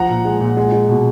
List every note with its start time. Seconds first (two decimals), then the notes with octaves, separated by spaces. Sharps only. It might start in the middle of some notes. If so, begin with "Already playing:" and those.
Already playing: F3 F#5 A#5
0.10 A#2
0.25 G#3
0.41 A#2
0.57 G#3
0.72 G#3
0.89 B2